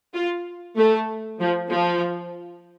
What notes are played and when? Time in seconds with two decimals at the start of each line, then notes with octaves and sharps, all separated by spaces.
0.15 F4
0.77 A3
1.40 F3
1.71 F3